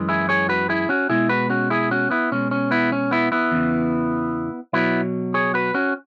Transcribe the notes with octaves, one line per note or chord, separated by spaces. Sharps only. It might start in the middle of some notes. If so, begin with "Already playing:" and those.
Already playing: F#2 E3 G#3
E4 G#4
G#4 C#5
F#4 B4
E4 G#4
C#4 F#4
B2 G#3 E4 G#4
F#4 B4
C#4 F#4
E4 G#4
C#4 F#4
B3 E4
B2 G#3 C#4
C#4
B3 E4
C#4
B3 E4
B3 E4
E2 C#3 E3
B2 F#3 B3 E4
G#4 C#5
F#4 B4
C#4 F#4